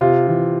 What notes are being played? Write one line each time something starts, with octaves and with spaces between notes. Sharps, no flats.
C3 F4
E3